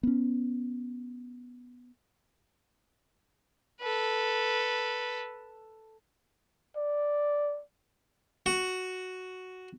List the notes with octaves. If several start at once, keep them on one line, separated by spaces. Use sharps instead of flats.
B3 C#4
A4 B4
D5
F#4